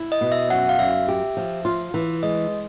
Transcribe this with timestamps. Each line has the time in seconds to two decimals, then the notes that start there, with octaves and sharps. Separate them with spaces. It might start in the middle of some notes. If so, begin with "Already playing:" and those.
Already playing: E4
0.12 D#5
0.21 B2
0.32 E5
0.50 F#2 F#5
0.69 F5
0.79 F#2 E5
1.08 G4
1.37 F3
1.65 F4
1.94 E3
2.23 G#3 D#5